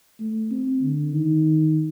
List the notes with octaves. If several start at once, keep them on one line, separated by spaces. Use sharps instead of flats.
A3
C4
D3
D#3